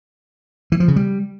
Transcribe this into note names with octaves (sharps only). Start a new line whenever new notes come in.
E3
F3
C#3
G3